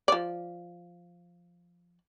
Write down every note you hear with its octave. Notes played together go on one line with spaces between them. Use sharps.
F3 D5